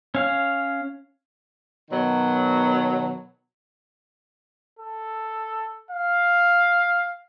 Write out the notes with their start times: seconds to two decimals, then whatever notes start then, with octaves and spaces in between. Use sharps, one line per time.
0.15 C#4 F5
1.91 B2 D#3 F#3
4.79 A4
5.91 F5